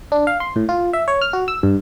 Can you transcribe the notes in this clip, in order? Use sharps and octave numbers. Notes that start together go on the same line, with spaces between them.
D4
F5
C6
A2
F4
E5
C#5
F6
F#4
E6
G2